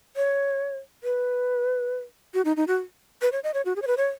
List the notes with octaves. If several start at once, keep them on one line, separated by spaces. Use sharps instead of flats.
C#5
B4
F#4
D#4
D#4
F#4
B4
C#5
D#5
C#5
F#4
G#4
C#5
B4
C#5